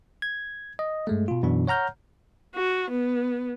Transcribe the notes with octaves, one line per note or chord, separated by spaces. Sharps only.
G#6
D#5
G2 G#3 A3
B2 F4
F#2 B2 E3 D4
C#5 F#5 A#5 F6 G6
F#4
B3